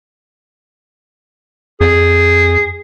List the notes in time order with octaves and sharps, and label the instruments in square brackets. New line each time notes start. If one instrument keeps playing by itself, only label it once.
[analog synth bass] F2 [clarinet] G#4